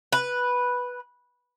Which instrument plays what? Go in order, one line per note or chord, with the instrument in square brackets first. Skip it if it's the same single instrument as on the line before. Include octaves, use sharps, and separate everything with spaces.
[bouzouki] B4